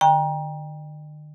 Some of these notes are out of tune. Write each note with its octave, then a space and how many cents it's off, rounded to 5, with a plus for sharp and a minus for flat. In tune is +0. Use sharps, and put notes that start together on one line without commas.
D3 +45 G5 +20 A#5 +25